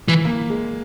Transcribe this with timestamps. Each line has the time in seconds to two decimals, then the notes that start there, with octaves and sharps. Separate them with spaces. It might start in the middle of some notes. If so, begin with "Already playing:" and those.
0.08 E3
0.25 A#3
0.50 G#3